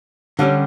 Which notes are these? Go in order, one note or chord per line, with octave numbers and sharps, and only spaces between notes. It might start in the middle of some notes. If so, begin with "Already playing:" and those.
D3 G3 C#4 G4